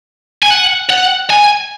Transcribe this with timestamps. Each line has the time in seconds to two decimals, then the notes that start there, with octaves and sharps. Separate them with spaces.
0.43 G#5
0.50 F#5
0.90 F#5
1.30 G#5